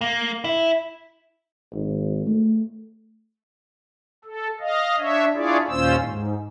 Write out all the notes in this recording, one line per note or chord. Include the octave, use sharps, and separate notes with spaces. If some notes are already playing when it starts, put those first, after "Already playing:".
A#3
E4
G#1
A3
A4
D#5 F5
D4 C#5 E5
D4 E4 F4 G#4 C#5 D5
D#2 A#2 C#4 F4 C5 E6
G#2